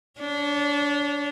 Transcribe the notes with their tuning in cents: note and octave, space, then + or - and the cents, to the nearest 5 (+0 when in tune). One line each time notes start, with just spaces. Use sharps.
D4 -25 C#5 +5